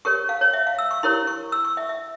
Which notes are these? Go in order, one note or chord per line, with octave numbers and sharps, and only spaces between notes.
G4 A#4 C#5 C#6
F5
C#5
E5
F5
E6
C#6
E4 G4 A#4 C#5 C6
C#6
E6
C#6
E5
E5